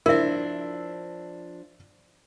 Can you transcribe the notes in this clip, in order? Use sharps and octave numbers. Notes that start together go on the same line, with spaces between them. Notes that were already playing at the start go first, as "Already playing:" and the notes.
F3 D4 E4 A#4 D5 E5